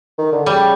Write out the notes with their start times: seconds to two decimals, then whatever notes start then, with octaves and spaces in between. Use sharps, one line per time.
0.18 D#3
0.32 D3
0.46 C#3 G3